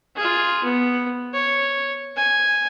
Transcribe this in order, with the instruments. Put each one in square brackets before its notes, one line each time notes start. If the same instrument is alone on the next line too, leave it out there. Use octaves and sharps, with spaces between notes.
[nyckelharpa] F4 G#4
B3
C#5
G#5